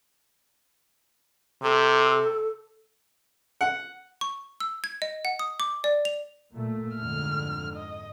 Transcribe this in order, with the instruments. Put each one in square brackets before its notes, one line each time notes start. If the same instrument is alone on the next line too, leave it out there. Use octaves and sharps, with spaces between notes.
[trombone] C3 [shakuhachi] A4
[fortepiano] F#5
[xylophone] C#6
E6
G#6
D#5
F#5
D#6
D6
D5
F7
[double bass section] A#2 A3
[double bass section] F2 G#2 D3 [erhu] F6
[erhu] D#5